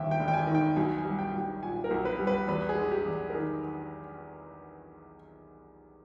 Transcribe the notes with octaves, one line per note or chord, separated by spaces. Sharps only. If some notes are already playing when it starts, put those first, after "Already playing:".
Already playing: E1 D#2 G3 E5 G5
G5
E1
G5
G#5
D#3
G5
B1 G#5
G#5
G3
G5
B1
G5
A#2 G#5
A#4
B1
B4
G3
B4
E2 B4
G#4
G#3
G4
E2
A#4
D#3 G#4